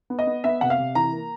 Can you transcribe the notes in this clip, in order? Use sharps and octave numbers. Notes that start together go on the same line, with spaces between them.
B3
D#5
B3
B3 E5
C3 F#5
F5
C3
E3 A#5
A#3